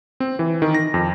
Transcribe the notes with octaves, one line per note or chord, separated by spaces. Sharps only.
C4
E3
D#3
A#6
F2